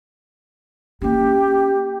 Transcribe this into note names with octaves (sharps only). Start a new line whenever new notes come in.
A#3 C#4 G4